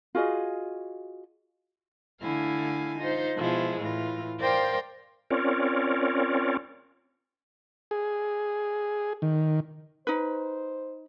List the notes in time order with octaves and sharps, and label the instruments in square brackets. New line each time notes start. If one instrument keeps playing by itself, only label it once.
[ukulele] F4 F#4 G#4 D#5
[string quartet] D3 A3 E4 F5 G#5
D#4 F4 C5
B2 F3 G#3 E4
A2 E3 F4
A#4 C5 D5 F5 G5 C6
[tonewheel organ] C4 C#4 F4 A#4 C#5 D5
[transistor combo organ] G#4
D#3
[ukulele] D#4 B4 [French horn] C5